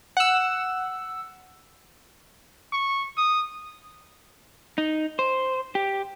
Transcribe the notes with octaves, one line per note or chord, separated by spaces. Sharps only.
F#5 E6
C#6
D#6
D#4
C5
G4